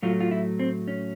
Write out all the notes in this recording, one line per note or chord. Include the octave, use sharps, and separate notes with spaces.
A2 F#3 A3 F4
F4
E4
C4
C#4